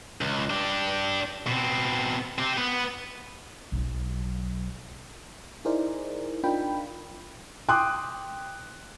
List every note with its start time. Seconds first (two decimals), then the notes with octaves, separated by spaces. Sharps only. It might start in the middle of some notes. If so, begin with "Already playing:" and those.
0.21 C#2
0.50 D4 G4
1.47 B2 C4
2.38 C4 G4
2.57 B3
3.72 B1 F#3
5.65 D#4 E4 G#4 A#4 C5 D5
6.44 D4 D#4 F4 A#4 G5 B5
7.69 G5 C6 D6 D#6 F#6